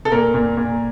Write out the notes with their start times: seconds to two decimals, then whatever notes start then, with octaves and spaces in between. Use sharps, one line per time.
0.05 A4
0.12 A#2 A#4
0.34 A#2
0.57 A#2